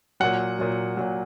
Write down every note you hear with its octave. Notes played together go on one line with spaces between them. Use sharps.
A#2 F#3 F#5
A#2 F#3
A#2 F#3